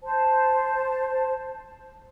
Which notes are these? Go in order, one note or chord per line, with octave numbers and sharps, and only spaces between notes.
C5 A5